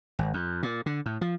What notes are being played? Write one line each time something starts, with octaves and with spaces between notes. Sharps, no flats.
G#1
F2
A#2
D3
A2
F3